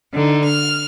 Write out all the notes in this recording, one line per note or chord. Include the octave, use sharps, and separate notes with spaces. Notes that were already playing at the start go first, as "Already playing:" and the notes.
D3 D#4
F6